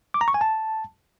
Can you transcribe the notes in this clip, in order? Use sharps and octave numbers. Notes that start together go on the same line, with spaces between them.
D6
A#5
C#6
G#5
A5